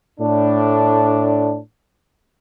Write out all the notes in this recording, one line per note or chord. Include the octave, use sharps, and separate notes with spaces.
A2 D4